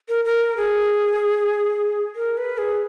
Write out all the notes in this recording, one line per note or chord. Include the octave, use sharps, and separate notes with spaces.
A#4
A#4
G#4
A#4
B4
G#4